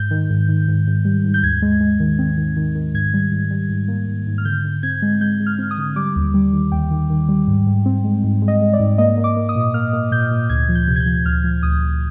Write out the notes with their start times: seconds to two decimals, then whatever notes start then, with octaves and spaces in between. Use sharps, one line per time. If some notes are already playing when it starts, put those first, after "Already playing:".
Already playing: G#2 G6
0.11 D#3
0.30 G#2
0.49 D#3
0.68 G#2
0.87 G#2
1.05 G3
1.24 G#2
1.34 G6
1.43 D#2 G#6
1.62 G#3
1.81 G#3
2.00 D#3
2.19 C4
2.38 D#3
2.57 D#3
2.75 D#3
2.94 G#2 G#6
3.14 G3
3.32 G#2
3.51 G3
3.69 G#2
3.88 A#3
4.07 G#2
4.27 G#2
4.38 F6
4.45 D3 G6
4.64 D3
4.83 C4 G#6
5.02 G#3
5.21 G#3 G6
5.40 G#3
5.46 F6
5.59 C4
5.71 D#6
5.78 D3
5.96 G3 D6
6.16 D#2
6.34 G3
6.53 D#3
6.72 D#2 G5
6.90 D#3
7.10 D#3
7.29 G3
7.47 G#2
7.66 G#2
7.86 C4
8.04 G#3
8.24 G#2
8.42 G#3
8.48 D#5
8.61 G#3
8.73 D5
8.80 G#2
8.98 A#3 D#5
9.17 A#3
9.24 D6
9.37 A#3
9.49 D#6
9.55 A#2
9.74 A#3 F6
9.93 A#3
10.12 A#2 G6
10.31 A#2
10.49 D2 G#6
10.69 F3
10.75 G6
10.88 C3
10.96 G#6
11.00 G6
11.06 F3
11.26 D2 F6
11.44 F3
11.63 D2 D#6
11.82 D2